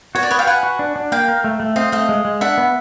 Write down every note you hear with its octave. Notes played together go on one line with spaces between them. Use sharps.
F#4 C#5
D5
B4 C#5 D#5
F5 G5
B4 F#5 G#5
F#4
D4
D4
A#3 F5 G5
A#4
A3
A3
C4 D#5 F5
A3 D#5 F5
G#3
G#3
D4 E5 F#5
B3